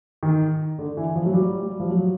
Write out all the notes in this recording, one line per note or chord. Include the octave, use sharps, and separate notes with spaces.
D#3
D3
E3
F3
F#3
G3
G3
F3
F#3